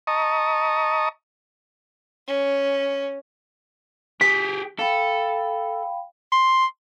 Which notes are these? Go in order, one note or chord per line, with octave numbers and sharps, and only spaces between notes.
D#5 A5 A#5 C#6 D#6
C#4
G4 G#4 B6
A4 F5 G5 B5
C6